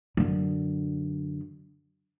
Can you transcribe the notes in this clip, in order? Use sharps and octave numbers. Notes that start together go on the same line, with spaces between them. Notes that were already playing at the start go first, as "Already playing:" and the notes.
F#2 D3